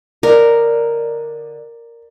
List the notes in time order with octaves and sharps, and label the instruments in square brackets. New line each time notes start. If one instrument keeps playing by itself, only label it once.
[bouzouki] D3 D#4 [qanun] A#4 [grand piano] D5